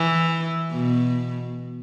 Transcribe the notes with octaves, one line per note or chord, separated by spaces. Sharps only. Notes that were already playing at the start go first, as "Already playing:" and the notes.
Already playing: E3
B2